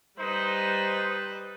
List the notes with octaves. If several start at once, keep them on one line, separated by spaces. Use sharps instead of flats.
G3 D#4 B4 C5